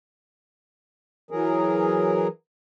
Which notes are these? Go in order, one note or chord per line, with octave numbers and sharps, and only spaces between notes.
E3 F#3 G#4 A#4